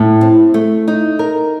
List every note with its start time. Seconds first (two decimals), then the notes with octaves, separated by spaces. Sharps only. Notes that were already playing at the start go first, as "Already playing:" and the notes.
Already playing: A2
0.21 C4
0.54 A3
0.88 D#4
1.19 A#4